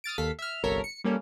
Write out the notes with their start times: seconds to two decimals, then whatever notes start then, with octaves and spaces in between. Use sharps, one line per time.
0.04 D#6 F6 A6 D7
0.18 D#2 A4 F5 B6
0.39 E5 F6
0.63 G1 C2 A4 A#4 C#5 B6
0.84 C#7
1.04 G3 A#3 C#4 A4